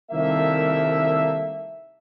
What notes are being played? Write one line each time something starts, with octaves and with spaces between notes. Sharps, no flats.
C2 D#3 A3 A#3 E5